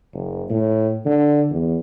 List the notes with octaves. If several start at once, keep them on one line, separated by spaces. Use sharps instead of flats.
F#1
A2
D3
E2